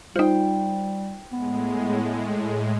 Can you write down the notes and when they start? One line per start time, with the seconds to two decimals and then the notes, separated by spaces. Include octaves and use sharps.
0.16 G3 D#4 F4 C5 G5
1.32 A2 G#3 B3